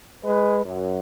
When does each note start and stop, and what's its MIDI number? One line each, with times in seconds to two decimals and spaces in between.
0.25 0.61 56
0.25 0.61 71
0.65 1.00 42